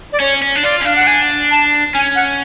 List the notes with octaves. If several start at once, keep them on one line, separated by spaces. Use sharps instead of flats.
D5
C#4 C#5
C#4
D4
F4 D5
C#4
D4 F5
F#5
G#5
A5
C#4 G#5
F#5